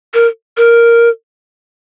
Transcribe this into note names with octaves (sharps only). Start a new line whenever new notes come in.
A#4
A#4